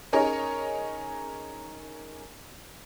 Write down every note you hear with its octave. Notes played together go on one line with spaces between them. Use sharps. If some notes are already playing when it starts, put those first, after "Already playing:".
C#4 D#4 G#4 A#4 C#5 D#5